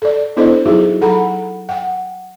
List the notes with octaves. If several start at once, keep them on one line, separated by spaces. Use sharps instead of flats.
A4 D5
B3 D4 E4 A4 C5 D#5
F#3 D#4 E4 F#4 G#4
F#3 A4 F#5 A#5 B5
F#5 G5